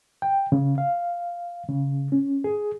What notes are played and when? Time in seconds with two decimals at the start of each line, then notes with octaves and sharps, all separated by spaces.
0.22 G5
0.52 C#3
0.78 F5
1.69 C#3
2.12 C#4
2.44 G#4